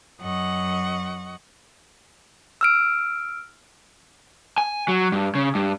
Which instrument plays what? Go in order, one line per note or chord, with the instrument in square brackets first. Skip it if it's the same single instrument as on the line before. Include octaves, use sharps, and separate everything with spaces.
[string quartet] F#2 D#5 F#5 C#6
[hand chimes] E6 F6 D7
[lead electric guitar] G#5
F#3
G2
C#3
G2